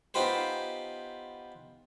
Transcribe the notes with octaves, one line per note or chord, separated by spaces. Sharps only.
B3 D#4 F4 G4 B4 C5